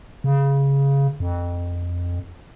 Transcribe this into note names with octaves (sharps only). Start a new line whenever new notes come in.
C#3
F2